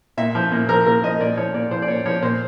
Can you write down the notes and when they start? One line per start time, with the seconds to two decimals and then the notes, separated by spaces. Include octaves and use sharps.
0.17 A#2 E5
0.35 F3
0.52 A#2
0.69 F3 A#4
0.86 A#2 A#4
1.03 F3 D#5
1.20 A#2 D5
1.37 F3 C#5
1.54 A#2 D5
1.71 F3 C5
1.82 D5
1.88 A#2 C#5
2.06 F3 C#5
2.22 A#2 C5